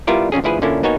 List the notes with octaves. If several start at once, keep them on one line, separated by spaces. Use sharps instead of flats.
G3 B3 E4 F4 A#4 D5
F2 C#3 C#4 G#4
D2 F3 E4 G#4 B4
A#2 D3 A#3 C#4 D4 E4
A#3 B3 D#4 F#4 C#5 G#5